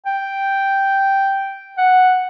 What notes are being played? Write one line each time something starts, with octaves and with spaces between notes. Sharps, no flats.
G5
F#5